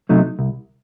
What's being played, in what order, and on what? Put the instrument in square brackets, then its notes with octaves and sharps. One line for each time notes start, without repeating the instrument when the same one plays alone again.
[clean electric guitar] C3 F#3 A3 D#4
C2